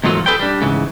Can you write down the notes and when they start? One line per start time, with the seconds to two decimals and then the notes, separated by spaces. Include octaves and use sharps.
0.04 E2 G#2 D#3 F#3 F4 A4
0.26 G#4 A4 B4 D5 G5
0.40 G3 D4
0.61 G#2 C#3 E3